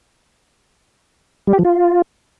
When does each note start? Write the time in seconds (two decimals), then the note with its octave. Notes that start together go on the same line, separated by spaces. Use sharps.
1.47 G3
1.53 G4
1.59 F3
1.65 F4